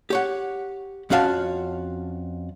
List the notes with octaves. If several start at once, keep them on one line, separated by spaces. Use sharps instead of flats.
G4 C#5 F#5
F2 C#4 F#4 F5 A5